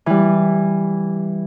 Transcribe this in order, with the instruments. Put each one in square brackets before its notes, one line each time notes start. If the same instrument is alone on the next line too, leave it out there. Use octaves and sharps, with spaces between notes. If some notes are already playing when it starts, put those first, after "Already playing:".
[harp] E3 G3